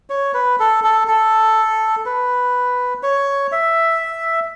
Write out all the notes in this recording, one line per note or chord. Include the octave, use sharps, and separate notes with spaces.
C#5
B4
A4
A4
A4
B4
C#5
E5